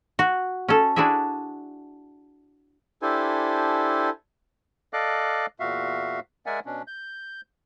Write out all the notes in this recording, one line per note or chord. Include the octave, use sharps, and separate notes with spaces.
F#4
C#4 A4
D4 E4 F#4 G#4 E5
D4 E4 G4 A4 C5 G#5
A4 D5 D#5 F5 D6 F#6
E2 A#2 F#4 E5 F5
G#3 A#4 D5 E5 F#5 G#5
B2 C#4 D4
G6